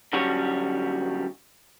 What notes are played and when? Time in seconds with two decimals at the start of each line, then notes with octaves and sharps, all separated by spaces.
0.13 D3 F#3 G3 C#4 F#4 C#5